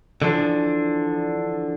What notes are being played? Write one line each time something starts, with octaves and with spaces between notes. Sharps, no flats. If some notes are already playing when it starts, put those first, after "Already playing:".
D3 E3 F3 D4